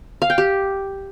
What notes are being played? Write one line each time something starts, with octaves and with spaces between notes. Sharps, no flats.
F5
G5
G4